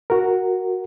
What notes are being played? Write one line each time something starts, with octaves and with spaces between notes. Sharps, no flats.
F#4 A#4